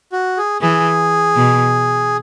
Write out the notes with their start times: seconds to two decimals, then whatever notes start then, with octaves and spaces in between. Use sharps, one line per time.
0.12 F#4
0.37 G#4
0.61 E3 G#4
1.36 B2